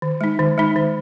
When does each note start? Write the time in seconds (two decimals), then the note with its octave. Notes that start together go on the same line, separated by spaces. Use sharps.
0.02 D#3
0.21 G#3 D#4
0.39 D#3
0.58 G#3 D#4
0.76 D#3